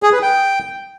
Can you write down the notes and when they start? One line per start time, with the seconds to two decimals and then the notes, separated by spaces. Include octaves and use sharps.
0.03 G#4
0.13 B4
0.22 G5